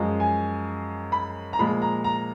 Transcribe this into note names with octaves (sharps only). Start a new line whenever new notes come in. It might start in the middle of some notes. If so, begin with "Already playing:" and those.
Already playing: F#2 F3 G#3
G#5
B5
A#5
A#2 F3 G#3 B5
A#5
A#5